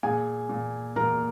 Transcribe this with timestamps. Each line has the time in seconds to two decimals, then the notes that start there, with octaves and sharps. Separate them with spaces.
0.03 A#2 G#4 G#5
0.49 A#2
0.96 A#2 A#4 A#5